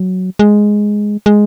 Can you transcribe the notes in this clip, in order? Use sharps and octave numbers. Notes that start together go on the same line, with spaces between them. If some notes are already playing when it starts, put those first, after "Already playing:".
Already playing: F#3
G#3
G#3